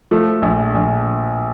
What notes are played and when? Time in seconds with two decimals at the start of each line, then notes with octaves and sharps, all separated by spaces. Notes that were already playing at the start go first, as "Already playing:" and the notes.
0.11 F3 A3
0.42 A#1
0.74 A#1